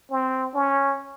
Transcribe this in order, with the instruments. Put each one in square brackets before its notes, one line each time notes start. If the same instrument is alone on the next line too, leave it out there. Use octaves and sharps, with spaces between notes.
[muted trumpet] C4
C#4